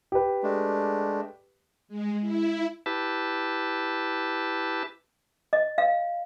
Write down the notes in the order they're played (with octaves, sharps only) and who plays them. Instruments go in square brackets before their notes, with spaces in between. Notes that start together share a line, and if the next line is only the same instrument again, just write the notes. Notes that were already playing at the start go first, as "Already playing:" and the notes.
[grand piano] G4 B4
[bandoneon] G#3 A3 D4
[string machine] G#3
E4
[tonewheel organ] E4 G4 B4 A5
[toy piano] D#5
F5